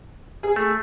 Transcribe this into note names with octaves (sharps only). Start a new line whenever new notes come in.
G#4
A3